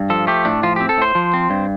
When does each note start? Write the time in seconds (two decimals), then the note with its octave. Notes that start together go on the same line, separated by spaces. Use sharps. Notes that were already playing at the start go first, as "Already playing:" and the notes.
Already playing: G2
0.10 F3 A4
0.27 A3 G4
0.45 A2 D4
0.63 F3 F4
0.76 C4 G4
0.89 A4
0.98 A2 C5
1.15 F3
1.34 C4
1.50 G2